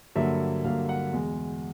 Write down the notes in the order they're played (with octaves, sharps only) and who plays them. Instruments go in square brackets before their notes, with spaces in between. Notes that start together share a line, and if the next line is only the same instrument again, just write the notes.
[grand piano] G2 D3 F#3 A#3 E5
G2 D3 F#3 A#3 F5
F#5
E2 B2 G#3